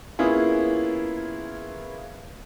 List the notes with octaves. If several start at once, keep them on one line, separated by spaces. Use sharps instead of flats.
A#3 B3 C#4 E4 F4 G#4